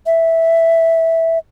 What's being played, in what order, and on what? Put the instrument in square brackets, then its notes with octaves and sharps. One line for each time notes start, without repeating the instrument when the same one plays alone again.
[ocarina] E5